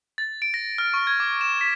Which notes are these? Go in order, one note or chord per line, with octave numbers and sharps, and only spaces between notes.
A6
D7
A#6
F6
C#6
G#6
D6
E7
B6